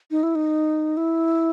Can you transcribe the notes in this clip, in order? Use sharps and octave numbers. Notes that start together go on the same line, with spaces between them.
D#4
E4
D#4
E4